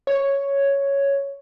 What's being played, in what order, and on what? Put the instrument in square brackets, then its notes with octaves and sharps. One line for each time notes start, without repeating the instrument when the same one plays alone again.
[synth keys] C#5